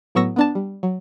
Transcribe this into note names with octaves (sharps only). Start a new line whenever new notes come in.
A2 F#3 B3 C#6 E6 A#6
B3 D4 A5
G3
F#3